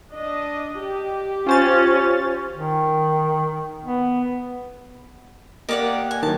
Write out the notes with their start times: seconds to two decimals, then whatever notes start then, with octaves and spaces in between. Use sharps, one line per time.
0.12 D4 D#5
0.80 G4
1.46 C#4 F4 C5 A6
2.53 D#3
3.85 B3
5.69 A#3 G4 A#4 D5 D#5 F#5
6.11 G#5
6.23 D#3 F#3 A5